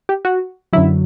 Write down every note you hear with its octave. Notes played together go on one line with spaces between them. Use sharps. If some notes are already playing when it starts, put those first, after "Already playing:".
G4
F#4
F#2 D3 F#3 E4